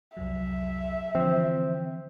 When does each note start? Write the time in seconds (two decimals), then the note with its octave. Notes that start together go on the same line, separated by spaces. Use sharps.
0.17 C2 F2 F#3 E5
1.15 D3 E3 F3 C4